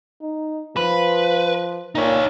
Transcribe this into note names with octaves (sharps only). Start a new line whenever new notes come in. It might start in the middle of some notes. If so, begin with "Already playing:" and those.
D#4
F3 B4
A#2 D#4 C#5